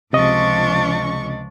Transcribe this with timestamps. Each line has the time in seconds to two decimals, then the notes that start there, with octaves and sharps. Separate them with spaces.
0.13 C#2 C3 F3 D4 D#5 C#6